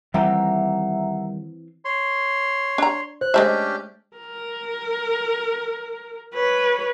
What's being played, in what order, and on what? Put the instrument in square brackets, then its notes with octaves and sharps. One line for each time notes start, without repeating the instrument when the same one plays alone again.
[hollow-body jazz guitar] D#2 G3 G4 [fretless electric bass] E3 C4 [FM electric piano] E5 A#5 [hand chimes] F#5
[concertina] C#5 C6
[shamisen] D4 A#5
[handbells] C5 [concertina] F#6
[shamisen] G#3 A3 E5 [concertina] C#4 D4 G4 [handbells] C5 D#5
[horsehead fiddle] A#4
B4 C#5